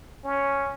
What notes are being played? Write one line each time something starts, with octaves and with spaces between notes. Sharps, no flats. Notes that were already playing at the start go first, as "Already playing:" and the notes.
C#4